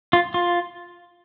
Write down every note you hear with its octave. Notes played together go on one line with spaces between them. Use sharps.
F4
F4